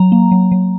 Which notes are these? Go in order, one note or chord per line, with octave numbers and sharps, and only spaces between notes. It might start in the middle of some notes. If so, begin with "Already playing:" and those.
Already playing: F#3 A#5
A#3
F#3
F#3